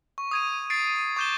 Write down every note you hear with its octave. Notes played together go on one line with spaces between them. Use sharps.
C#6
D#6 G#6 D#7
A6 C7 D7
C#6 D6 G6 E7 G7